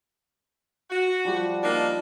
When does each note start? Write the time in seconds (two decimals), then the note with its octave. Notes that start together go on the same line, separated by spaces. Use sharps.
0.90 F#4
1.25 F3 G3 G4
1.62 A#3 D4 D#4